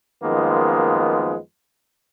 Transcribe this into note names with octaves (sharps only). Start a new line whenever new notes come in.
F#2 D#3 F3 G#3 A#3 B3